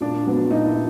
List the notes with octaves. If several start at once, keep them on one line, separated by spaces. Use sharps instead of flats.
A#2 D4
F#3 B3
A#2 D#4
E4